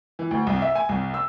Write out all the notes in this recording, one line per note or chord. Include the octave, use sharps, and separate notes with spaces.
E3
D2
C2
E5
G#5
C2
E6